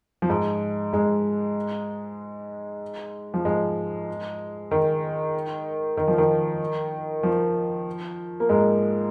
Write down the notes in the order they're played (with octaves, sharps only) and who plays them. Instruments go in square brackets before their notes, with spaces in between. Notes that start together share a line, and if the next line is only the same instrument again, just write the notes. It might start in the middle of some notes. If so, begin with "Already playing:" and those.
[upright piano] F3
G#2 G#3
G#2 G#3
F3
G#2 G#3
D#3
D#3
F3
D#3
F3
A#3
G#2 G#3